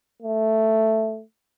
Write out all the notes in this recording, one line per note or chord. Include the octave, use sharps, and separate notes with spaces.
A3